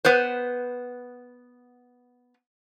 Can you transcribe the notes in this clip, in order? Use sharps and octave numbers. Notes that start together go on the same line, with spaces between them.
B3 B4 C5